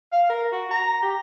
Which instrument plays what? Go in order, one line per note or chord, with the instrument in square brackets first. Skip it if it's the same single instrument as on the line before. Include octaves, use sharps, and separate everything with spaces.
[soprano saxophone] F5
A#4
F#4
A#5
G4